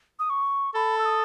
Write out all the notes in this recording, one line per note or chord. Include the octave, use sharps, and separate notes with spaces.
D#6
C#6
A4 B5
E6
D#6